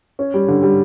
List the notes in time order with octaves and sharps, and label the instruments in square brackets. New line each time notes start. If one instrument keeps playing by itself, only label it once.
[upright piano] C#4
G3
D3
G3